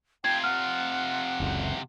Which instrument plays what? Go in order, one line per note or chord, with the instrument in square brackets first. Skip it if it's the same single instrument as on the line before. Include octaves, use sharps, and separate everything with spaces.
[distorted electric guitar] C3 F4 [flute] G5 [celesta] G#6
[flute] F#5 [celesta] F6
[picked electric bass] F#1 C#2